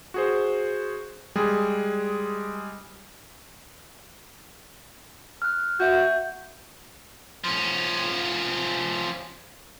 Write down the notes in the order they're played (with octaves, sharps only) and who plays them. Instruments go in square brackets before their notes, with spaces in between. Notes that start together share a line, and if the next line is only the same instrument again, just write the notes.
[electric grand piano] F#4 G#4 C5
G3 G#3 G#4
[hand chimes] F6 F#6
[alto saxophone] F#4 [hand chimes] E5 G6
[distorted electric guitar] F3 C#4